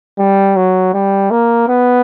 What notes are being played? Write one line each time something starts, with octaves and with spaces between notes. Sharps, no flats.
G3
F#3
G3
A#3
B3